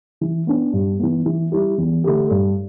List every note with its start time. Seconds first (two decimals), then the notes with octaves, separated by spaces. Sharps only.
0.21 E3
0.47 B3 D4
0.73 G2
0.99 E3 B3
1.26 E3
1.52 G3 E4 G4
1.78 E2
2.04 D3 A3 G4
2.30 G2